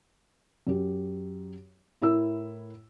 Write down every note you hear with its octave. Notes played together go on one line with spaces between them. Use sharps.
F#2 G4
A2 E4 A#4 E6